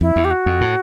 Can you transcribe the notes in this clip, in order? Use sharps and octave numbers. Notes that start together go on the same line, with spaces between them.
F2 E4
E2
G4
F#4
F2
A2